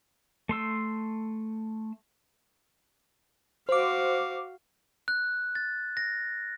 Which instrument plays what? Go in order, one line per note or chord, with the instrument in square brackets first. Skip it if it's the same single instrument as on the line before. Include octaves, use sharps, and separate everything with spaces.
[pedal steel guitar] A3 C6 E6
[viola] F#4 F5 [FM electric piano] C5 D6
[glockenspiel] F#6
A6
A#6